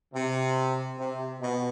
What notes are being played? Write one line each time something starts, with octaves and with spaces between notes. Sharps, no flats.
C3
C3
B2